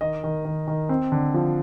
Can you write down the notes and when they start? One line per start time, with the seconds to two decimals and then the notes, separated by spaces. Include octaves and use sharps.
0.01 D#3 D#5
0.24 D#3
0.45 D#3
0.68 D#3
0.89 C4
1.12 D3
1.34 F3